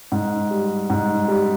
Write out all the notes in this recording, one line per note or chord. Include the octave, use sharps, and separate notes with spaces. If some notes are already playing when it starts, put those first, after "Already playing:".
G#2
G3
G#2
G3